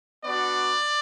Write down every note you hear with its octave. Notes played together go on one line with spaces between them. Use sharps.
B3 D4 F#4 D5